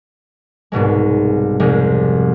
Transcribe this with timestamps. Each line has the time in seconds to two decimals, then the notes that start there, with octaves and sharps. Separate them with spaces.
0.72 C2 G#2 B2 G#3
1.60 C2 F2 C3 G#3